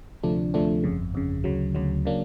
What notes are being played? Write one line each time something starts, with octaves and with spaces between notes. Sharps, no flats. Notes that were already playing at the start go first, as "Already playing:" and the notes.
D2 C3 F3 A3 D4
D2 C3 F3 A3 D4
G1 F2 C#3
G1 F2 C#3
D2 C#3 F#3
D2 C#3 F#3
C#3 F#3 A#3 D4